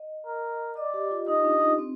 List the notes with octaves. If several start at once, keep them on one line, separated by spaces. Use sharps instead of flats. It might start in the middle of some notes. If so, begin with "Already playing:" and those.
Already playing: D#5
A#4
D5 D#5
G4
F4
D#4 D#5
D4
D#4
C4